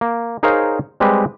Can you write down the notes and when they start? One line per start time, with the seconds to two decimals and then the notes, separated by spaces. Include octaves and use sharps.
0.01 A#3
0.43 D#4 G#4 A#4 C5 C#5 F5
1.00 G3 G#3 C4 G4 B4